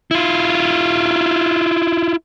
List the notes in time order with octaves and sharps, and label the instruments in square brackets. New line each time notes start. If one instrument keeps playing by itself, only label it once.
[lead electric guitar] E4 F4